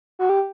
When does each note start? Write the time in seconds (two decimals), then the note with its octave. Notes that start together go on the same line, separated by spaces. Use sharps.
0.19 F#4
0.29 G4